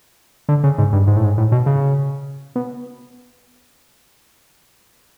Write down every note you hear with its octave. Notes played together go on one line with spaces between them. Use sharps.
D3
C#3
G#2
G2
G#2
A2
G#2
A2
B2
C#3
B2